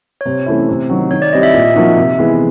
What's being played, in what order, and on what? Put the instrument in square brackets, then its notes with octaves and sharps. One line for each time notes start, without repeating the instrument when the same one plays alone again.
[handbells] C#5
[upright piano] C3 [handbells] C5
[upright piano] E3 A3 C#4 E4
C3
D#3 F#3
[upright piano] D#3 [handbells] C#5
[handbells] D5
[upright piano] G3 C4 E4 G4 [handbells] D#5
[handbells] E5
[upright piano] A#2
F3 A#3 D#4 F#4
C3
E3 G#3 B3